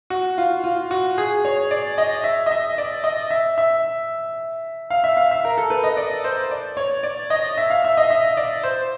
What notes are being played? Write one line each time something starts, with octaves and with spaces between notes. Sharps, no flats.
F#4
F4
F4
F#4
G#4
C#5
D5
D#5
E5
D#5
E5
D5
D#5
E5
E5
F5
E5
F5
E5
A#4
A4
B4
D#5
D5
C5
D5
C#5
D5
D#5
E5
F5
E5
D#5
E5
D5
C5